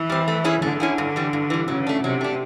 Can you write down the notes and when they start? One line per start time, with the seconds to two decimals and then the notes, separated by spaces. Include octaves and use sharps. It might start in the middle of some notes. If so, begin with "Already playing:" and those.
Already playing: E3
0.10 G3 C4
0.28 A3
0.44 C#4 E4 G#4
0.62 D3 A3
0.80 C#4 E4 G#4
0.98 G2
1.16 E3 G3
1.33 G2
1.50 E3 G3
1.68 C#3 F#3
1.87 A3 D4
2.04 C3 F#3
2.21 A3 D4